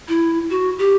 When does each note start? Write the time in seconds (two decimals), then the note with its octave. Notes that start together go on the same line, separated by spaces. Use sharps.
0.09 E4
0.50 F#4
0.79 G4